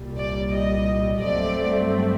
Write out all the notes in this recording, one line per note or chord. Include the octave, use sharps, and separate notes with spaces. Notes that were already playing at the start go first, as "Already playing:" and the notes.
Already playing: C2 A#2 G3
D5
D#5
G2 F#3 A3 C4 D5